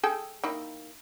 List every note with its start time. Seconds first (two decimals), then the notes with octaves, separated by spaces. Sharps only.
0.03 G#4 A4 G5
0.44 D#3 A#3 E4